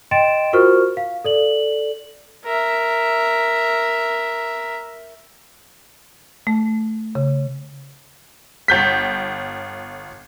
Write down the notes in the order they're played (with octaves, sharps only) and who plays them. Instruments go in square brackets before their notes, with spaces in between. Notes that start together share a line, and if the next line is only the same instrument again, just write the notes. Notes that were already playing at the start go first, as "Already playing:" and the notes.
[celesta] D#5 G5 C6 A6 D7 E7
F4 F#4 A#4 C5 C#6 F6
F5
A4 D5 F#7
[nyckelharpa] A#4 E5
[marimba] A3
C#3
[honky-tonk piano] G1 G6 B6